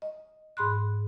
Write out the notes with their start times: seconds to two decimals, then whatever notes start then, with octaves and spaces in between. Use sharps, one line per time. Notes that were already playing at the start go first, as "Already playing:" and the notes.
0.02 D#5
0.57 G#2 G#4 B5 C6 F#6